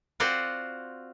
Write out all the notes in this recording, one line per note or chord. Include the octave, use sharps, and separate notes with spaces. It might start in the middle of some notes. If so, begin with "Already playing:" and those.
C4 F4 F#4 C5 D5 F#5